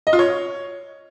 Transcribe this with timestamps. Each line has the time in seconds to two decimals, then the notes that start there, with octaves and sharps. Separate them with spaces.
0.07 D#5
0.13 F4
0.19 C#5